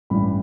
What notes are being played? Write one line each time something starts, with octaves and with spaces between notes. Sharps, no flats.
A1 G2 E3 G3 B5